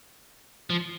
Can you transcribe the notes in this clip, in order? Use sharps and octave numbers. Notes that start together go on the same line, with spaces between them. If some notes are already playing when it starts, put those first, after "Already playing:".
F3